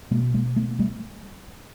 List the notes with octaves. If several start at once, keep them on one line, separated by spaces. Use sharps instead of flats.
B2 G#3 A#3
G#3 A#3
A3 B3
G3 A3